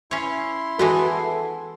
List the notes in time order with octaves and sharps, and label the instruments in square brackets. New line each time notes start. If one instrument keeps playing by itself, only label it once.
[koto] C#4 C#5 [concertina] E4 C6
[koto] E3 G#3 B3 [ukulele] F#4 [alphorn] A4